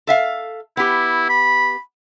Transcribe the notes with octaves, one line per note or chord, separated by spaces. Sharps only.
A4 E5 F5
B3 E4 G4
B5